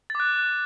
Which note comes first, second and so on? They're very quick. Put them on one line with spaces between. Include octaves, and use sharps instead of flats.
A6 D6 F#6